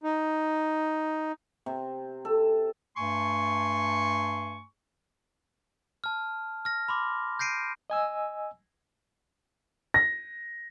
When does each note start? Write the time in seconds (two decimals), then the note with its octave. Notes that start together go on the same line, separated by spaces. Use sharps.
0.04 D#4
1.66 C3
2.25 A4
2.97 G2 A3 G#5 C6 C#6
6.04 A5 F6
6.65 F6 A#6
6.88 B5 C6 D6
7.39 G6 A#6 C7 D7 D#7
7.90 D#5 G#5 E6
9.94 A#6